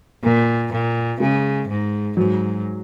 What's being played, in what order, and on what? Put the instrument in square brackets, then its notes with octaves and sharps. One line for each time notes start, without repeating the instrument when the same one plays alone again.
[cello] A#2 [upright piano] A#3
[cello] A#2
[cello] C#3 [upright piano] G#3
[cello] G#2
[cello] G#2 [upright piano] F#3